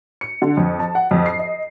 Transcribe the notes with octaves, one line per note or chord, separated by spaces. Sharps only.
C#7
D3
F2
A5
F#5
F2
C7
D#5